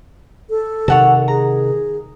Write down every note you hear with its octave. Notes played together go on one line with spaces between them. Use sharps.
A4
C3 D#3 C#5 F#5 A5
G#4 A#5